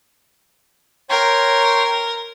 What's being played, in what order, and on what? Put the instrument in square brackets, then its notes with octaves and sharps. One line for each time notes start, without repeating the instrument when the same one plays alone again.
[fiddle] A#4 [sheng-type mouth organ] C#5 G5 C6